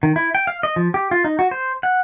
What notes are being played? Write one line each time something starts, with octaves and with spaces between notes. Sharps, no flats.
D#3
E4
G5
F5
D#5
F3
G4
F4
D#4
F#4
C5
F#5